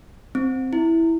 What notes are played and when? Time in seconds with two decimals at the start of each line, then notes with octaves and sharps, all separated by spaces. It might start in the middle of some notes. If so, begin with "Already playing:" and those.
0.35 C4
0.73 E4